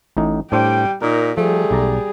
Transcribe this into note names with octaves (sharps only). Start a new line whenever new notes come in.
A1 A2 D#4
A2 G3 D4 C5 G5
A#2 D#4 A#4
F3 G3 A3 G#4
B1 D5 A#5